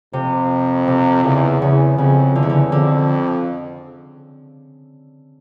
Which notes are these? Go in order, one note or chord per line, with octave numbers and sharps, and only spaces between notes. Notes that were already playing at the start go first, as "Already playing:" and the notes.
F2 C3
C3
E2 C#3
E2 C#3
F2 C#3
E2 D3
C#3
D3
F2 D3